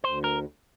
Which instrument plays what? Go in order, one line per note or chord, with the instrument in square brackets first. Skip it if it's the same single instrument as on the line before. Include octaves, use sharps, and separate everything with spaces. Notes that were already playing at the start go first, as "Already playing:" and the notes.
[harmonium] D2 [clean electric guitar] C5
[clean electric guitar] A#4